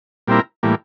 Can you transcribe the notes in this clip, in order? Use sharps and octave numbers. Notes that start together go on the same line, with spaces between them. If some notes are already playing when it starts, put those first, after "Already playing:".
A#2 G3 C4 E4 A#4
A2 E3 G3 A#3